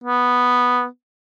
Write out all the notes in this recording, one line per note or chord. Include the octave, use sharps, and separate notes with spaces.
B3